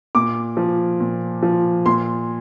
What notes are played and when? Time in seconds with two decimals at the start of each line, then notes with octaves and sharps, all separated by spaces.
0.15 A#2 D6
0.57 F3
1.00 A#2
1.43 F3
1.86 A#2 C6